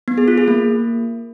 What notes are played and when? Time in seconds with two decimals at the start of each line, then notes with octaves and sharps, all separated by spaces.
0.08 B3
0.18 G#4
0.28 F4
0.38 G#4
0.48 A#3